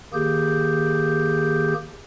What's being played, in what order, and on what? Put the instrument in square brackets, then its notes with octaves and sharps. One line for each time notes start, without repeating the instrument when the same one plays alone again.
[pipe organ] D#3 A#3 G4 G#4 G6